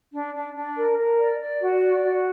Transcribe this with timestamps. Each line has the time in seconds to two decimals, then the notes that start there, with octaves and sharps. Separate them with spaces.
0.11 D4
0.33 D4
0.54 D4
0.75 A#4
0.96 A#4
1.17 D5
1.39 D5
1.60 F#4
1.80 D5
2.01 F#4